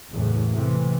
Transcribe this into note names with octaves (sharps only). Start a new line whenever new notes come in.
F#1 E2 A2
A2 C3 E3